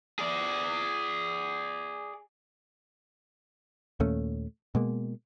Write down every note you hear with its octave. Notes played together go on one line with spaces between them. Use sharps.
G#4 D5
D#2 A#2 A3 C#4
B2 G#3 A#3